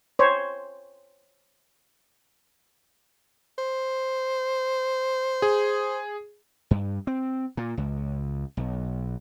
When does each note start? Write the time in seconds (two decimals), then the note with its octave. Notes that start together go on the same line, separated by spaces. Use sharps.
0.19 C5 C#5
3.58 C5
5.42 G#4
6.71 G2
7.07 C4
7.57 A#2
7.77 C#2
8.57 B1